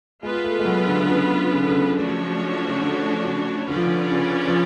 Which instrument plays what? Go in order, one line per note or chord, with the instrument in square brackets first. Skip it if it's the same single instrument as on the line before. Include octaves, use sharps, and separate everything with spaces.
[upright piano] G#3 [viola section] B3 F4 B4
[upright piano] A3
G#3
F#3
D3
D3
C#3
C#3
D3
C#3
[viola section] F3 A3 D4 F#4 C#5
[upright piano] C#3
D3
C#3
[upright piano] D3 [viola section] C#4 F4 B4 D5
[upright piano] F3
D3
C#3
F3